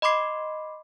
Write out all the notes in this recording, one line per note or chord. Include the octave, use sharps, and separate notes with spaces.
D#5 B5 C6 D6 C7